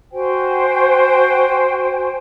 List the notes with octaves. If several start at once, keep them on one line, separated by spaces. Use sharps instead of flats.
F#4 C5 G5 G#5